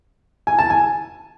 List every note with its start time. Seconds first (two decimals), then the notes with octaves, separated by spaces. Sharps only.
0.47 G#5
0.59 A5
0.70 G#5